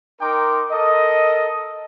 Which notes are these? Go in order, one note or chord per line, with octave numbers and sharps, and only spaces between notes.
D#4 A#4 G5 C6 D6
A4 A#4 D#5